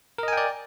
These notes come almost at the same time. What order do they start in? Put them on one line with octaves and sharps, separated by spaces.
A#4 D#5 G#5 G5 D5